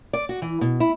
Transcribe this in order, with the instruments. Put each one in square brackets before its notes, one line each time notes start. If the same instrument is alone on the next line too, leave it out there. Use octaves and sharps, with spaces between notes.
[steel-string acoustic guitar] D5
F#4
E3
B2
E4